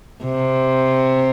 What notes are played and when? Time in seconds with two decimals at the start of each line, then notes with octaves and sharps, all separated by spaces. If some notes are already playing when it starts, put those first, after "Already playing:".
0.24 C3